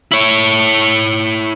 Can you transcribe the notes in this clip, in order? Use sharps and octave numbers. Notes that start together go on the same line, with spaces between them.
E4 C#5